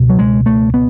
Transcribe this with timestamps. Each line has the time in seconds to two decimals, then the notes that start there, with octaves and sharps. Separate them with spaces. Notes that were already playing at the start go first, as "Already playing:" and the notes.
Already playing: C#2 B2
0.09 F#3
0.19 G#3
0.46 A3
0.74 B3